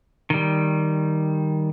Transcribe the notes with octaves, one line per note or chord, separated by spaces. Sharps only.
D#3 G3